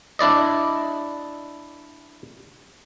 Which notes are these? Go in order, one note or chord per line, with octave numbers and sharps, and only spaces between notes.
D4 E4 D5 D#5